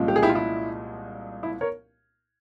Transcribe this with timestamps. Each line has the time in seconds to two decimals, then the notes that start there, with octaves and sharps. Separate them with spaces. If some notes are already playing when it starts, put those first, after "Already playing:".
Already playing: C2 A#2 F3 G#3 C#4
0.08 G4
0.16 G#4
0.23 E4 G4
0.29 F4
0.35 E4
1.43 E4
1.61 A#4 C#5